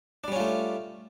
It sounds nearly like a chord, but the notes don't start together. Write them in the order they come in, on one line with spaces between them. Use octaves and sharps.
D4 G3 C#4 F4 A3